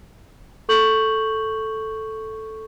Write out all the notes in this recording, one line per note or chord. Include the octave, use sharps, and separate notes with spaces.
A4 C#6 G6 F#7